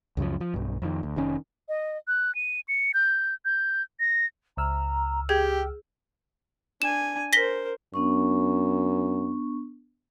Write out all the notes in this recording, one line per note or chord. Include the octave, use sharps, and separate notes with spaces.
C#2 F#2 C#3 F3
F3
B1 G2
F2 D#3
D2
F1 D#3 C#4
D#5
F#6
D#7
C#7
G6
G6
A#6
C#2 A#5 E6 F6
G4 G#4 G5 G6 G#6
D4 G#5 E7
A#4 C5 A#6 B6 G7
F#2 B3 D4 C#6